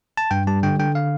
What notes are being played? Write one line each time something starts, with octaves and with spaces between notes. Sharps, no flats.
A5
G2 G5
G3 A5
D3 G5
D3 G5
F5